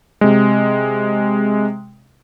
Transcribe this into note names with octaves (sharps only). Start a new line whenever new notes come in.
C3 G#3